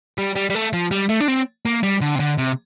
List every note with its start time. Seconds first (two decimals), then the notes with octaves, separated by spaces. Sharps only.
0.18 G3
0.35 G3
0.50 G3
0.55 A3
0.73 F3
0.91 G3
1.09 A3
1.21 D4
1.28 C4
1.66 A#3
1.83 G3
2.01 D3
2.15 C3
2.20 D3
2.38 C3